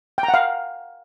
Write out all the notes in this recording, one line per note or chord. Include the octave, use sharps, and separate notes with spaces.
G5
A#5
F#5
F5